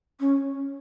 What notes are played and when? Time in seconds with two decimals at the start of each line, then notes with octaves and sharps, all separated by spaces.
0.20 C#4